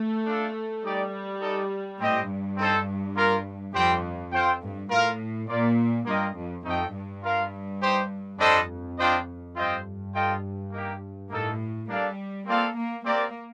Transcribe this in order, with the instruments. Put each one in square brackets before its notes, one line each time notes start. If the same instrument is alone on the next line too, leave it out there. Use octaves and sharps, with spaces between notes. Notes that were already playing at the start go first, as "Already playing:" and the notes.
Already playing: [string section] A3
[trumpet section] D4 F4 A4
[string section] G3 [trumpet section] D#4 G4 D5
[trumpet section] D#4 A4 D5
[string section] A2 [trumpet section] C4 G4 C5 D#5 G5
[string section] G2
[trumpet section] C4 D#4 A4 C5
A#3 F4 A#4
[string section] F2 [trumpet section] G3 C4 G4 C5 G5
[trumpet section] C4 F4 C5 G5
[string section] G2
[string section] A2 [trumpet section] F4 A#4 F5
[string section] A#2 [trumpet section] A#3 F4 A#4 D5
[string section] G2 [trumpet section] A#3 F4 A#4 D#5 G5
[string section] F2
[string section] F2 [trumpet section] A3 D#4 A4 D#5 G5
[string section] G2
[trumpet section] F4 A#4 F5
D#4 G4 C5
[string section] F2 [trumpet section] G3 D4 A4 C5 D#5
[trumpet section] D4 F4 C5 D#5 G5
[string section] G2 [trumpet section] C4 F4 C5 D#5 G5
[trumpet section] F4 A4 D#5 G5
A#3 D#4 G4
[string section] A2 [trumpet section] A#3 D#4 A4
[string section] G3 [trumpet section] A#3 D4 A4 D5 F5
[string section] A#3 [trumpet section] C4 F4 A4 D5 F5
[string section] A#3
[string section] A#3 [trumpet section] C4 G4 A#4 D5